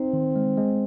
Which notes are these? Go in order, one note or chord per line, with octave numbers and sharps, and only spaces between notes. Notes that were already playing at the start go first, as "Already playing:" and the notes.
Already playing: C4 D#4
D#3
G#3
G#3